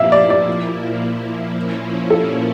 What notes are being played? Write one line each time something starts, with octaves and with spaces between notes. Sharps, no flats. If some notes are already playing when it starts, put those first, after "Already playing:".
Already playing: A#2 F3 A#3 E4 E5 F5
D5
D5
A#2 F3 A#3 C#4 E4
A4